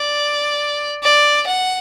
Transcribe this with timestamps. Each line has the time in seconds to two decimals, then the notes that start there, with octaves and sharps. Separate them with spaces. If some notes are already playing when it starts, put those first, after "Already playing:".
Already playing: D5
1.03 D5
1.47 F#5